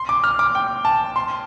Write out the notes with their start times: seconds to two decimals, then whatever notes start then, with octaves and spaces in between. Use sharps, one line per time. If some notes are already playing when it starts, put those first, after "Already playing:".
Already playing: C6
0.09 D6
0.24 F6
0.39 D6
0.55 G5
0.85 A5
1.16 C6